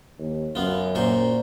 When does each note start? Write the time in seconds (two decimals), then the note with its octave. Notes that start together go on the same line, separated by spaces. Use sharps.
0.19 D#2
0.55 F#2 B3 F4
0.95 A#2 C5 C#6